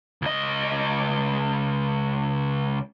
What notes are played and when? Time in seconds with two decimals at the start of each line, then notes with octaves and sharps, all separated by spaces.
0.22 C#2 D#5